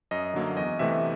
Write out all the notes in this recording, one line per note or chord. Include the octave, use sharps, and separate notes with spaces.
F#2 D#5
D3 F#3 A#3
E2 D#5
C3 E3 A3 E5